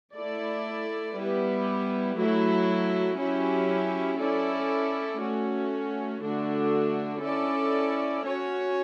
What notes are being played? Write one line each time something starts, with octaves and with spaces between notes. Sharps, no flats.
A3 E4 A4 D5
G3 B3 E4 G4 B4
F#3 A3 E4
F#3 C#4 E4 G4
C#4 E4 A4 D5
A3 C#4 F#4
D3 A3 D4 F#4
C#4 E4 A4 D5
C#4 F#4 C#5